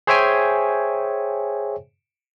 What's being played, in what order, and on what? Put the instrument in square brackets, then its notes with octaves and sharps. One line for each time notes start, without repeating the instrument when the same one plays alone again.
[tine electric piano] G#4 C5 C#5 E5 G5 G#5